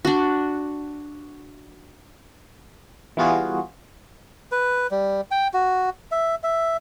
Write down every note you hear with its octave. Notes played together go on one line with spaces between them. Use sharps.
D4 F#4
E3 G3 B3 F4 F#4 G#4
B4
G3
G5
F#4
E5
E5